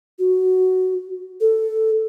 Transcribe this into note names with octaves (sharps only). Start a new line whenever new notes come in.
F#4
A4